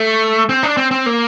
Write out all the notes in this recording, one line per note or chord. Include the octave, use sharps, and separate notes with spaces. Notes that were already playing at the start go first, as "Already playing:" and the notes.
Already playing: A3
C4
D4
C4
C4
A#3